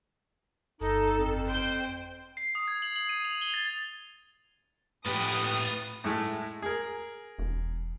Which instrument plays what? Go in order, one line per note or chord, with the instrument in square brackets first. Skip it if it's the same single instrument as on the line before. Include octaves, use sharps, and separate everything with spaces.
[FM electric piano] G1 [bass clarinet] D#4 [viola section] A4
[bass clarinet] F2
[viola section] C5 G5
[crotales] C7
D#6
G#6
F#7
F#7
D#7
F7
G7
A6
[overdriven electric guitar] A2 G4 [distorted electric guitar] F4 F#5 [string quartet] B4 [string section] D#6
[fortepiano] A2 G#3 A3
G#4 A#4
[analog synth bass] E1